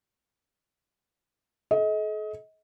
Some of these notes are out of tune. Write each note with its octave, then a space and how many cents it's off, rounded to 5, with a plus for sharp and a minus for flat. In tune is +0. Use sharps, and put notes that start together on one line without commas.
A4 -45 D#5 +30